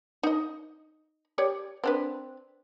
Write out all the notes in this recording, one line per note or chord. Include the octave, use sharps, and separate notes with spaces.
D#4 D#5
G4 C#5 D5
C4 D4 B4